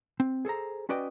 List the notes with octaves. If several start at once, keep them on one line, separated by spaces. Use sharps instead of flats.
C4
G#4 A4 C5 A#5
C#4 F#4 B4 D5 D#5 G5